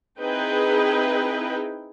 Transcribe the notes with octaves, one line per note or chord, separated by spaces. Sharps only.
C4 D#4 E4 G#4 B4 G5